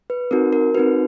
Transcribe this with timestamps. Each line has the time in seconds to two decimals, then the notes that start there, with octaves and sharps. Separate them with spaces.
0.10 B4
0.31 C4 D#4 F#4 A#4
0.53 A#4
0.75 C4 D#4 F#4 B4